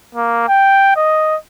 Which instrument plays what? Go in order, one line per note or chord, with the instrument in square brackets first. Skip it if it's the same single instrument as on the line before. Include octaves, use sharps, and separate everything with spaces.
[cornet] A#3
G5
D#5